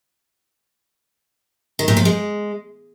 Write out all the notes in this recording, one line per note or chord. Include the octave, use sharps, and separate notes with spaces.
D#3
A#2
F3
G#3